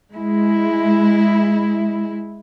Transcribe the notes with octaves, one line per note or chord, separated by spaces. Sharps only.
G#3 E4